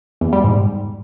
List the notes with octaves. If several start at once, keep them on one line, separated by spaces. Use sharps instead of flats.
E2
G3
G#2